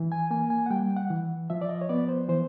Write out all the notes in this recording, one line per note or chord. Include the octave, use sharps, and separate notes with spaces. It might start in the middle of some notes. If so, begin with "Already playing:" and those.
Already playing: E3
G#5
A#3 G#5
G#5
F#5
G3 G5
F#5
E3
F3 E5
D5
D#5
C#5
B3 D5
C5
E3 C5